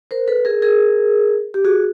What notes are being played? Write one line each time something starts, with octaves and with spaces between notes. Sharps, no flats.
A#4 C5
A4 B4
G#4 A#4
G#4 A#4
G4
F#4 G#4